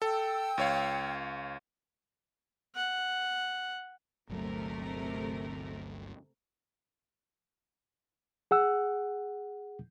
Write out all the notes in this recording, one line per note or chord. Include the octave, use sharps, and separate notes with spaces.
A4 G5 E6
C#2 C#5 F5
F#5
G1 D2 C3 F#3 A3 A#4
G#4 F#5 E6